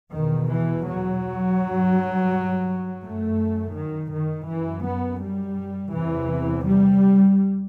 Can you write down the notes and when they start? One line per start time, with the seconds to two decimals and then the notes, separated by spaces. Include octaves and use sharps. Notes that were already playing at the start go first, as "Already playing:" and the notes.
0.12 E2 B2 D#3
0.48 E3
0.85 F#3
1.58 G2
3.02 F#2 A3
3.75 D#3
4.12 D#3
4.48 F#2 E3
4.84 B3
5.21 G3
5.93 E2 C3 E3
6.66 G3